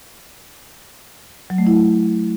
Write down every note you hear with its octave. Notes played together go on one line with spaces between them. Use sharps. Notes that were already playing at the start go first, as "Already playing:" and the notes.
F#3
A3
E4